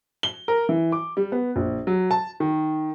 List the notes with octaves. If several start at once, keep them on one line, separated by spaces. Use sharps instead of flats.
G7
A#4
E3
D6
G3
B3
A#1
F#3
A5
D#3